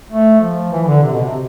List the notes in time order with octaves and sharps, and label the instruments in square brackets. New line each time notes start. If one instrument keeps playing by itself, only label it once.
[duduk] A3
F3
E3
E3
D3
C3
B2
C3